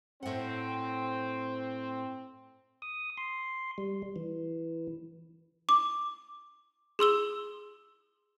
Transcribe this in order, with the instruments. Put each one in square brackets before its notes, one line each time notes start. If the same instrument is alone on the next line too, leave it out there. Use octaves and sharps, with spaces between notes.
[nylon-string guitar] A2 F#5 [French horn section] C4
[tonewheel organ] D#6
C6
G3
E3
[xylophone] D6
G#4 C6 E6 G7